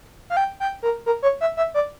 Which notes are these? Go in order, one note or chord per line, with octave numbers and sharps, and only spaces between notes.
F5
G5
G5
A#4
A#4
C#5
E5
E5
D5